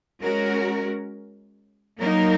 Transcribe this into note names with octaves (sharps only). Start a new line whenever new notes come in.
G#3 C#4 F#4 A#4
F#3 A#3 D#4 A#4